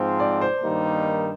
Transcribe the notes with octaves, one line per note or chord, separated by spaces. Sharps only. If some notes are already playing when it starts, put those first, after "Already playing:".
Already playing: G#2 F3 C4
D5
C5
G2 D#3 G3 A#3 D#4